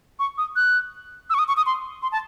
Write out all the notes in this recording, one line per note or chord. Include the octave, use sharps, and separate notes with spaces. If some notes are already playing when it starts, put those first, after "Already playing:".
C#6
D#6
F#6
E6
C#6
D#6
C#6
D#6
C6
C6
A5